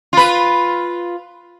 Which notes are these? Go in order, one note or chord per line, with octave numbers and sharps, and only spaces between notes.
F4 B4